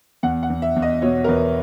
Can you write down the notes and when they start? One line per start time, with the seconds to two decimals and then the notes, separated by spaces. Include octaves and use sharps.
0.23 E2 F#5
0.43 F#5
0.50 E2
0.62 E5
0.76 E2
0.82 D#5
1.02 B2 C#5
1.24 A#4
1.28 E2 B4